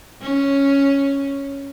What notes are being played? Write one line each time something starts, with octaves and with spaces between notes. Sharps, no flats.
C#4